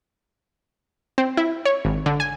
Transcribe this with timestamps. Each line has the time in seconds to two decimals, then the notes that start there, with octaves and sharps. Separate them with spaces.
1.18 C4
1.37 E4
1.65 C#5
1.85 G#1
2.06 D3
2.20 G#5